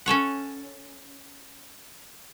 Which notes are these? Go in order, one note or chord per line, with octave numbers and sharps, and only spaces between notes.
C#4 A4 C#5 F#5